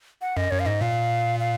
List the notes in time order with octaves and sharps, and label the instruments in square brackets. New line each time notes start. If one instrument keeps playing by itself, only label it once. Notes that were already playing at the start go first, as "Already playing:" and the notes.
[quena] F#5
[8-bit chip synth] F#2 [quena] D#5
[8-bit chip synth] F#2 [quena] C#5
[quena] F5
[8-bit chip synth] G#2 [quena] D#5
[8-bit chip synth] A#2 [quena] F5
[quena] F5